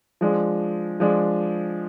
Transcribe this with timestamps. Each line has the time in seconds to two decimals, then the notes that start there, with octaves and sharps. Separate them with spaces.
0.21 F3 G#3 D4
1.00 F3 G#3 D4